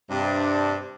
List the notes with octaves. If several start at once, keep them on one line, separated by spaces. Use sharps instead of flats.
G2 C3 D4